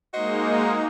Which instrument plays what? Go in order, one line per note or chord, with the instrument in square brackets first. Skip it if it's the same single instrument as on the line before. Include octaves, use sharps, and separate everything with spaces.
[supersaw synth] G#3 A#3 D#4 [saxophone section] F#4 C5 D#5